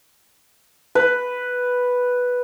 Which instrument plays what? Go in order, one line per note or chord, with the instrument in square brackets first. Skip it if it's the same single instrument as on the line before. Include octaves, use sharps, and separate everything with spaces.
[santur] B4